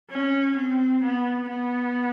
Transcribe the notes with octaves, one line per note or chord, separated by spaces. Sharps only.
C#4
C4
B3
B3